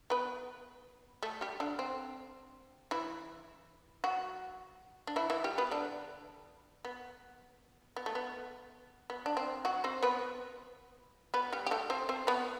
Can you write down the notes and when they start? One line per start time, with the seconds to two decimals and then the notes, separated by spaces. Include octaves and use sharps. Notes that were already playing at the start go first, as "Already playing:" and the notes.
0.10 B3 B4
1.23 A3 A4
1.41 G3 G4
1.60 D3 D4
1.79 C4
2.91 E3 E4
4.04 F#3 F#4
5.07 D4
5.16 E3 E4
5.30 E3 E4
5.44 G3 G4
5.58 B3 B4
5.71 D3 D4
6.85 B3
7.96 B3
8.06 A3
8.15 B3
9.10 B3
9.26 D4
9.37 C4
9.65 F#3 F#4
9.84 C4 C5
10.03 B3 B4
11.34 B3 B4
11.53 G3 G4
11.66 G4
11.71 A3 A4
11.90 C4 C5
12.09 C4 C5
12.27 B3 B4